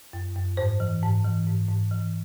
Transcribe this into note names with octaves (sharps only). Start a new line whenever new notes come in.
F#2
F#2
G#2 C5
E3
G#2
E3
G#2
G#2
E3